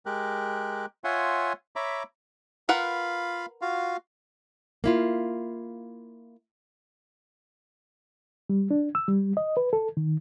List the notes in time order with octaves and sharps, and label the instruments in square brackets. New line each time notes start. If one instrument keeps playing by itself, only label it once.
[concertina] G#3 G4 A#4 F#6
F4 C#5 E5 F#5 G#5 C6
C#5 E5 A#5 B5 D6
[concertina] F4 F5 B5 [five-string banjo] A#4 B4 F#5
[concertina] F4 F#4 F5
[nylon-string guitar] A#3 E4 F4
[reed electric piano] G3
D4
E6
G3
D#5
B4
A4
D#3